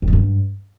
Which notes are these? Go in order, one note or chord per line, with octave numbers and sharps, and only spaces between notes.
F2
F#2
G2